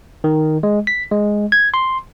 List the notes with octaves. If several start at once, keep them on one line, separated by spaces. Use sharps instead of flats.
D#3
G#3
B6
G#3
G#6
C6